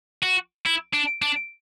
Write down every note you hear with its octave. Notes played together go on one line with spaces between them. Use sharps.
F#4
E4
D4
D4